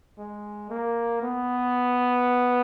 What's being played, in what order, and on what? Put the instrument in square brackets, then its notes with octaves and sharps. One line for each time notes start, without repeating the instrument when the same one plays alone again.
[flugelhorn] G#3
A#3
B3